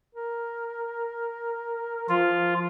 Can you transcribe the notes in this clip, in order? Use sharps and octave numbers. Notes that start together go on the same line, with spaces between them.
A#4
F3 F4